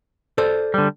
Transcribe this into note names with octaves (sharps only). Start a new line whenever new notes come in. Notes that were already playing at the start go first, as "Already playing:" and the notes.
A4 C5 D5
D3 G3